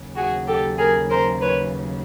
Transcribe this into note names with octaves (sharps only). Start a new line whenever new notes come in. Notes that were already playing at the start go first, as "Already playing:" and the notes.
Already playing: D#2 C#3 F#3
F#4 G#4
G4 A4
G#4 A#4
A#4 C5
B4 C#5